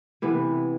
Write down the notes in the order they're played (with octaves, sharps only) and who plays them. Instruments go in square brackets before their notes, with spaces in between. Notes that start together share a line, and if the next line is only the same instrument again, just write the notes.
[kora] C3 E3 B3 E4